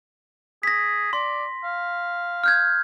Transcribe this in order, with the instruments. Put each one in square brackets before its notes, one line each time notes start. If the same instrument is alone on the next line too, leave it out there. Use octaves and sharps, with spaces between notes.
[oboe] G#4 [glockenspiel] A#6 B6
[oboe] D5 [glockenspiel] C6
[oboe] F5
[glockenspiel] F6 G6 G#6